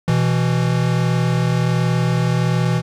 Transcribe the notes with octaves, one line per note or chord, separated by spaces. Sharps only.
B2 E3